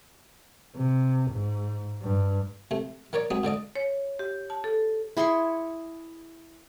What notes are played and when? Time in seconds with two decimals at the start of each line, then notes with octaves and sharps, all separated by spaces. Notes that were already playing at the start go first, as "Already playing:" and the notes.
0.76 C3
1.32 G#2
2.02 G2
2.71 C3 A3
3.13 D#3 A#4 C#5 D5
3.31 F#3 G#3 C4 D#6
3.43 G#2 D3 D5 D#5
3.76 C#5
4.19 G4
4.50 A5
4.64 A4
5.17 E4 G#4 C6 C#6